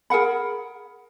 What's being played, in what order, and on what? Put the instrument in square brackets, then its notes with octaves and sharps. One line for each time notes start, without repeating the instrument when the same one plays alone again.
[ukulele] G#4 A#4 F#5 B5